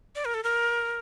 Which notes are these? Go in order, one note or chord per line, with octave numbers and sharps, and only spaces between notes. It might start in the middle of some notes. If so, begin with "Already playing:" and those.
D5
A#4
A4
A#4